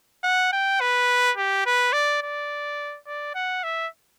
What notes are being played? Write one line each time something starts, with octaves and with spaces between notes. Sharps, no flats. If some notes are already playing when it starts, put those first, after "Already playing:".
F#5
G5
B4
G4
B4
D5
D5
D5
F#5
E5